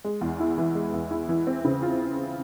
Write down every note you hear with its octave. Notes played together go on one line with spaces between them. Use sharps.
G#3
E2
E4
E3
G#3
E2
E4
E3
C4
C#3
F4